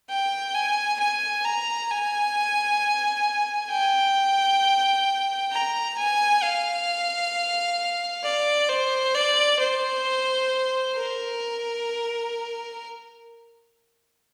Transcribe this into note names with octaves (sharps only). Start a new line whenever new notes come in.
G5
G#5
G#5
A#5
G#5
G5
A#5
G#5
F5
D5
C5
D5
C5
A#4